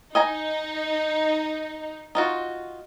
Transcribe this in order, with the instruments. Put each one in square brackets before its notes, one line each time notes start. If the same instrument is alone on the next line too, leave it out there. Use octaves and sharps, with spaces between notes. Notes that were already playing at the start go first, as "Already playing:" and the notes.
[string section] D#4 [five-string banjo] D#5 G#5 A#5
[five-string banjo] D#4 F4 F#4